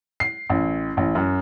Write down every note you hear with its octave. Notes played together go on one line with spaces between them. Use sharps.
C7
A1
A1
F#2